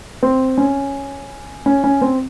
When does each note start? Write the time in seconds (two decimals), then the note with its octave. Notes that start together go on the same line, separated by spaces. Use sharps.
0.23 C4
0.58 C#4
1.66 C#4
1.84 C#4
2.01 C4